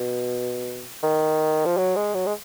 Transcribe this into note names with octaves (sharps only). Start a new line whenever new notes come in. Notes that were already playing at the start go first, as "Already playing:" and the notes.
Already playing: B2
D#3
F3
F#3
G#3
F#3
G#3